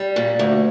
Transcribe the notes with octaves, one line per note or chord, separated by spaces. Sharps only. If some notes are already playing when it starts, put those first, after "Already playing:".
Already playing: G3
A#2
D2